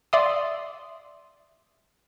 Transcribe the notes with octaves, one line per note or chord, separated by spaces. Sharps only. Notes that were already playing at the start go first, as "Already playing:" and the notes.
D5 E5 C6 D#6